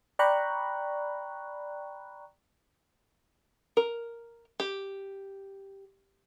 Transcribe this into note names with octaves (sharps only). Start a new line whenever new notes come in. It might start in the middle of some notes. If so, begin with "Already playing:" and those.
D5 G5 A#5 B5 C#6 F#6
A#4
G4